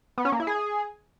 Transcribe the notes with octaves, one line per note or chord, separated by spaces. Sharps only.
B3
C#4
A#3
E4
G#4